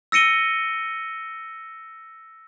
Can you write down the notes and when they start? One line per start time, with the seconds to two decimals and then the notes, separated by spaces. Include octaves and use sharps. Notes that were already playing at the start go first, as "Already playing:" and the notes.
0.12 E6 A#6 C#7 D#7 G7